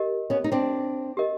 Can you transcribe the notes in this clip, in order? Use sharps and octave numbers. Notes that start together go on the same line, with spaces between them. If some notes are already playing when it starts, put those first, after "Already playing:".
Already playing: G4 A#4 D#5
B3 C#4
D#4
C4 D4
G4 A#4 D#5